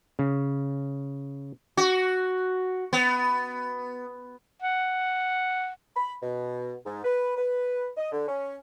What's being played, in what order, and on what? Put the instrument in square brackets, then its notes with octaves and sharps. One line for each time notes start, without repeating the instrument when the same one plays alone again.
[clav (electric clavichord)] C#3
[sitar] F#4
B3
[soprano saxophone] F#5
[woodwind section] B5
B2
G#2
B4
B4
D#5
D3
C#4